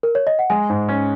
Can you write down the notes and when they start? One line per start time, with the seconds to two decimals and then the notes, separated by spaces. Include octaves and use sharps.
0.03 A#4
0.15 C#5
0.27 D#5
0.39 F#5
0.50 G#3 G#5
0.70 G#2
0.89 C#4